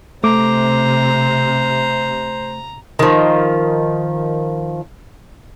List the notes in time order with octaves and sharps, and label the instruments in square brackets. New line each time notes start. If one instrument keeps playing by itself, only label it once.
[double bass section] C3 [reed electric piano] A3 D6 [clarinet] C5 [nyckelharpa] A#5
[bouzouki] D#3 F3